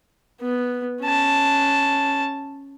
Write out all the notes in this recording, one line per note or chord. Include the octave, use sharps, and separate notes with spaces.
B3
C#4 A5